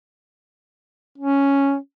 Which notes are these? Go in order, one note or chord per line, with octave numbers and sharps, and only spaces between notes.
C#4